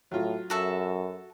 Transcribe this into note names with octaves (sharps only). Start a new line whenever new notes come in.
A2 F#3 F4
F#2 F#4 A4 E5